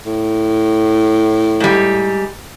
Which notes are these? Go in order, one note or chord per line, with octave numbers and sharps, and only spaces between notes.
A2
G#2 G3